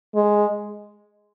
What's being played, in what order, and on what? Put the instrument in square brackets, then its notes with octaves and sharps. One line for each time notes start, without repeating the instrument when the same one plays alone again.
[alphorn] G#3